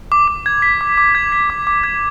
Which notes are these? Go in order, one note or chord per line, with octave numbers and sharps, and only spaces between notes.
D6
D6
G#6
B6
D6
D6
G#6
B6
D6
D6
G#6